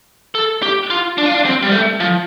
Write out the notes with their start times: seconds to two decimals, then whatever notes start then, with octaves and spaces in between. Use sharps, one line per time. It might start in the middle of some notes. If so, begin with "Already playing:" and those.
0.35 A4
0.63 G4
0.90 F4
1.18 D4
1.26 F4
1.34 D4
1.45 C4
1.62 G3
1.72 A3
2.00 F3